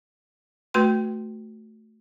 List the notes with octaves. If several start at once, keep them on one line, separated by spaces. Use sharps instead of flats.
A3 F#4 B4 G5 C6